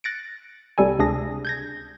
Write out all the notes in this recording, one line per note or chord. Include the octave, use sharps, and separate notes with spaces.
F#6 A6 A#6 C#7 D7
C2 C3 G3 A4 G#5
C#2 C3 D4 G#4 A#6
G6 G#6 A#6